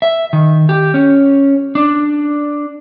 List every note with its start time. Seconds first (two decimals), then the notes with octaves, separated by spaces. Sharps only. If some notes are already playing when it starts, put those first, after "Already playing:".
0.02 E5
0.33 D#3
0.69 G4
0.94 C#4
1.75 D4